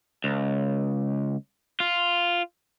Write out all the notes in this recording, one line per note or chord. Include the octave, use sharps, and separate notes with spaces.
C#2
F4